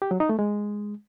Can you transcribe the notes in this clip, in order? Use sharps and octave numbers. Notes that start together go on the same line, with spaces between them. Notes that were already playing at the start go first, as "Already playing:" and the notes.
G4
F#3
D#4
A3
G#3